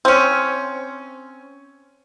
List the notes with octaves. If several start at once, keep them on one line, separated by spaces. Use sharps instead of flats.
C4 C#4